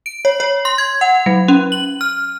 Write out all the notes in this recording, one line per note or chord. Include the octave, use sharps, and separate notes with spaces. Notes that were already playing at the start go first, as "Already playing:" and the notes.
D7
C#5
C#5
C6
G#6
F#5
F#3
C#4
F#7
F6